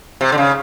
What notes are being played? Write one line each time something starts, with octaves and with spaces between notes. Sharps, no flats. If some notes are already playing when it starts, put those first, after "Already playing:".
C3
D3
C#3